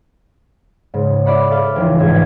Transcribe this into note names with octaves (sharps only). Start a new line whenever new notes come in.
G#2 C#3
D5 E5 F#5 B5 C#6
A4 F5
F1 C#2 E3
A1 G#2 G#6